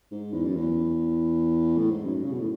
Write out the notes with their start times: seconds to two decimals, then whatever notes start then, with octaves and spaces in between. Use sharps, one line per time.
0.12 G#2
0.33 E2
0.45 F#2
0.56 E2
1.77 A2
1.91 G#2
2.04 F#2
2.24 C#3
2.31 B2
2.40 A2